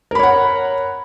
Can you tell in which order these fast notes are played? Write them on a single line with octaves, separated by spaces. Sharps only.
A#4 B5 C#5 F#5